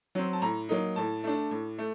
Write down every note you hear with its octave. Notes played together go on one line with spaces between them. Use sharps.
F#3 C4
A5
A2 A#5
F#3 A#3 D#4
A2 A5
A3 D4
A2
A3